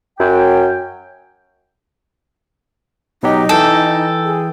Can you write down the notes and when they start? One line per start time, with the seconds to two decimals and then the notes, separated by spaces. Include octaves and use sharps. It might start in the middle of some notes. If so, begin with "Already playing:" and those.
0.18 F#2 G5
3.23 B2 F#3 D#4 G4
3.49 E3 A4 G5 E6
4.24 G#4